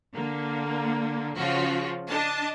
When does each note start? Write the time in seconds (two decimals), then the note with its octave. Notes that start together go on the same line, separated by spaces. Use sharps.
0.15 D3 A#3
1.38 C#3 F3 F4 F#4
2.10 D4 D#5 A5